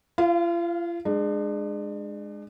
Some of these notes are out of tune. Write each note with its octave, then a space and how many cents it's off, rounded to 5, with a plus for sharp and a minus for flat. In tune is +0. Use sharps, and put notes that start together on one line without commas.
F4 -40 F5 +0
G#3 +0 D4 +35